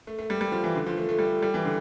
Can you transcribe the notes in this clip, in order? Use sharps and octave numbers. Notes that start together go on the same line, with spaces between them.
A3
A3
G3
G3
F3
E3
D3
F3
A3
A3
G3
A3
G3
E3
D3